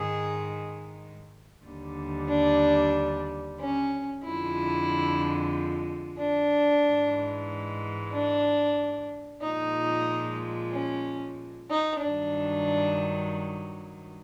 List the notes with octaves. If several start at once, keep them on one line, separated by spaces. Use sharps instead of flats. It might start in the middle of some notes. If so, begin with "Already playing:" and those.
Already playing: G#2 D#3 G#3 G#4
D#2 D3 G3
D4
C#4
F2 D3 F3 G#3 E4
D4
G#2 E3 G#3
D4
A#2 F3 G#3 D#4
C#4
D#4
G2 D#3 F#3 D4